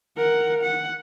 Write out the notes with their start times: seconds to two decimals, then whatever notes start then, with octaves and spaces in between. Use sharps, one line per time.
0.18 A#4 F#5
0.62 F#5